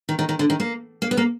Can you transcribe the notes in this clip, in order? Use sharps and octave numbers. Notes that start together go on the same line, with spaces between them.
D#3
D#3
D#3
D3
D#3
A#3
A#3
B3
A#3